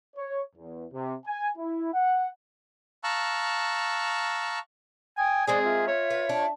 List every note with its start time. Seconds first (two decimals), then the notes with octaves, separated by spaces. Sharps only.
0.17 C#5
0.56 E2
0.93 C3
1.26 G#5
1.57 E4
1.93 F#5
3.04 F5 A5 A#5 C#6 E6 F#6
5.17 G5 G#5 D#6
5.47 G#3 C4 G#4 A#4 D5 G#5 D#6
5.63 F4 E5
5.87 C#5
6.10 B4
6.29 D4